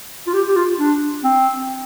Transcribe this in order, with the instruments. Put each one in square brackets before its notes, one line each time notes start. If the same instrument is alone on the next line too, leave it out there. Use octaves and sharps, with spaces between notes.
[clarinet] F4
G4
G4
F4
D4
C4